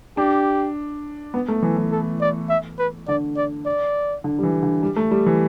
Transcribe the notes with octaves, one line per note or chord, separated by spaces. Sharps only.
D4 G4
B3
A3
E3
E3
A4
D5
E5
B4
D3 D5
D5
D5
D3
G3
E3
D3
G3
A3
G3
E3